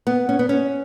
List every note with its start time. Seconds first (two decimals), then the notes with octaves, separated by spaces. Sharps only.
0.07 B3
0.29 C#4
0.39 B3
0.49 C#4